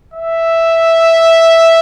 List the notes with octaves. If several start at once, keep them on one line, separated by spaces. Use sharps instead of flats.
E5